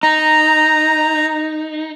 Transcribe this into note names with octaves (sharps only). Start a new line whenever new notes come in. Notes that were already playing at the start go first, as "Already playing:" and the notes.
D#4 A#5